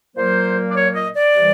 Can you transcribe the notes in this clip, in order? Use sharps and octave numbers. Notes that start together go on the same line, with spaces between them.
A#2 F#3 A#3 C5
D5
C#5
D#5
D5
C3 E3 G3